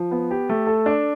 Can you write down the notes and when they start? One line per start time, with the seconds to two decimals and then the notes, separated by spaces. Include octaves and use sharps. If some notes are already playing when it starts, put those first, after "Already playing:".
Already playing: F3
0.11 B3
0.31 G4
0.49 A3
0.67 A4
0.86 D4